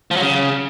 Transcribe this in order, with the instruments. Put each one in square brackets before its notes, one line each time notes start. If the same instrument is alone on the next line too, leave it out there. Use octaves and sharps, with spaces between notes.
[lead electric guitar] F3
F#3
C#3